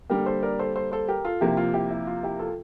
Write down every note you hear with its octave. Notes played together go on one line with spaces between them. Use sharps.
D3 G3 A#3 G4 A#4
A4 C5
A#4 D5
A4 C5
A4 C5
A4 C5
G4 A#4
F4 A4
C3 F3 A#3 E4 G4
F4
E4 G4
E4
F4
E4 G4
F4 A4